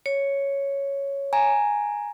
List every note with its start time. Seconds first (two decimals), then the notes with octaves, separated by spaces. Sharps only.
0.06 C#5
1.33 G#5 A#5